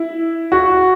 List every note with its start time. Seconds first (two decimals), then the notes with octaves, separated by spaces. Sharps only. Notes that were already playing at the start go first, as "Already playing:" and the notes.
Already playing: E4
0.52 F#4